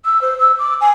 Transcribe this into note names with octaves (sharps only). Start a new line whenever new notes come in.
E6
C5
E6
D6
G#5